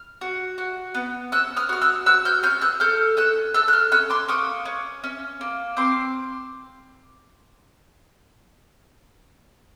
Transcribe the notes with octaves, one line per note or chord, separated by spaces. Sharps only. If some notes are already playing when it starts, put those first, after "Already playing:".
Already playing: F6
F#4
F#4
B3
C#4 E6 F#6
D#6 F6
F#4 F6
E6 F#6
F#4 E6 F#6
F6 G6
C#4 F6 G6
E6 F#6
A4 F6 G6
C#4 E6 F#6
A4 E6 F#6
F#6
F6 G6
C#4 E6 F#6
C6 D6
A#3 C#6 D#6
C#4
C#4
A#3
C4 C6 D6